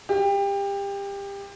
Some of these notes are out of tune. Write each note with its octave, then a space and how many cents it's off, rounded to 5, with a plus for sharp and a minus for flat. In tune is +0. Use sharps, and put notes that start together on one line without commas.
G4 +25